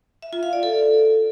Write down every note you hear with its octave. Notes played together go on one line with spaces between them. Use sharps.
E5
F4
F5
D5
A4